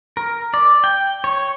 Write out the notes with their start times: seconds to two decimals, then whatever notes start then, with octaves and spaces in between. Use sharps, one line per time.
0.17 A#4
0.54 D5
0.84 G5
1.24 C#5